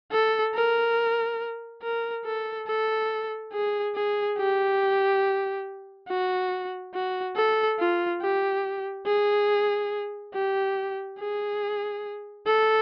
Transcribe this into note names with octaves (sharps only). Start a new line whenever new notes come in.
A4
A#4
A#4
A4
A4
G#4
G#4
G4
F#4
F#4
A4
F4
G4
G#4
G4
G#4
A4